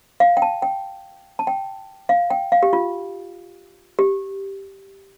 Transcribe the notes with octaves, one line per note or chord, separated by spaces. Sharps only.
F5
G5
A5
G5
A5
G5
F5
G5
F5
G4
F4
G4